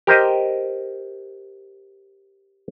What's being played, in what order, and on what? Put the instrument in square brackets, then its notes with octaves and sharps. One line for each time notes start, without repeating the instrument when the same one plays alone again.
[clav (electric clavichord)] G4 A#4 C5 D#5